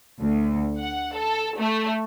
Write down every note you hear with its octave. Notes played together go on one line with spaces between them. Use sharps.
D2
F#5
A4
A3